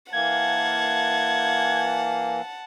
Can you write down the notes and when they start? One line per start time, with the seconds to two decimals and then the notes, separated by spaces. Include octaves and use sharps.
0.13 E3 A#3 F#5 A5 G#6